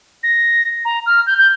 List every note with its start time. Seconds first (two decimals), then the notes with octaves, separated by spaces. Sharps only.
0.23 A#6
0.85 A#5
1.06 F6
1.27 G6
1.38 G6